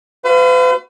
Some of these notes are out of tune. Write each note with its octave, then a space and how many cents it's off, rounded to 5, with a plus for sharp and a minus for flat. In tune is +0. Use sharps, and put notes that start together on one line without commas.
F#4 +0 B4 +45 F5 -35